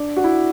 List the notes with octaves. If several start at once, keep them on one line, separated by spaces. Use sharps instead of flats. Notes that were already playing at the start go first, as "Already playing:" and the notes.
Already playing: D4
F#4
E4